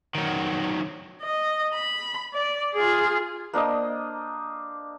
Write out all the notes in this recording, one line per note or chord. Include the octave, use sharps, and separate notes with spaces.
D#3 F#3
D#5
B5
D5
F4 G#4
A#3 D4 C5 D#5